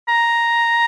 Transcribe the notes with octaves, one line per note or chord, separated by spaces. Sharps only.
A#5